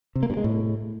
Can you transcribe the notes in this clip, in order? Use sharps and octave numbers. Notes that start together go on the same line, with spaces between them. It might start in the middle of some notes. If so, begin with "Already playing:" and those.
C3
A#3
G2
G#3
A2